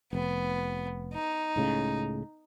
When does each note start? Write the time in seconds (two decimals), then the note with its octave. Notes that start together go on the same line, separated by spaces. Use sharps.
0.13 F1 B3
1.13 D#4
1.56 C#2 A2 C#3